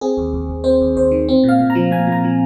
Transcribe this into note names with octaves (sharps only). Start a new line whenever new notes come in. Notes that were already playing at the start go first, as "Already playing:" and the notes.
C4 G#4
D#2
D#2
D#2
C4 C5
D#2
D#2 C5
D#3
C4
A#2
F5
A#2
A#5
F3
A#2 G#5
A#2
A#5
F3